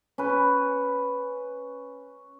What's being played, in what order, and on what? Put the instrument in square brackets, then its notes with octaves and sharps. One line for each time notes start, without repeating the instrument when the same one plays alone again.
[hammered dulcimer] C#4 B4